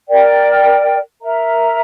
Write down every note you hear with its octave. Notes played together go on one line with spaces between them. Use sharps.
A#4 D5 G5
A#4 E5 A#5